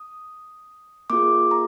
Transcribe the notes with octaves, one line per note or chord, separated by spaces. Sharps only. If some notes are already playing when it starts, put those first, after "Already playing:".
Already playing: D#6
A#3 F4 G#4 D6
A#5